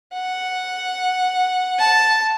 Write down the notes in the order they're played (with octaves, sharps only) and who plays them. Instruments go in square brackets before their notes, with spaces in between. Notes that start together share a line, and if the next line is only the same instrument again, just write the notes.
[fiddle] F#5
A5